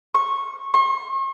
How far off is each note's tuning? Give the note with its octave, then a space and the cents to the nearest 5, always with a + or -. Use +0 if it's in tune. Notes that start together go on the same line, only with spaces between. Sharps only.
C#6 -15
C#6 -45